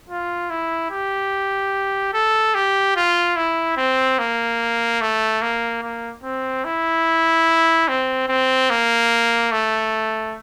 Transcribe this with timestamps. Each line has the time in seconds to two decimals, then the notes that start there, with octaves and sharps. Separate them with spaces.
0.09 F4
0.50 E4
0.91 G4
2.14 A4
2.55 G4
2.96 F4
3.36 E4
3.77 C4
4.19 A#3
5.01 A3
5.42 A#3
5.83 A#3
6.23 C4
6.65 E4
7.88 C4
8.29 C4
8.70 A#3
9.52 A3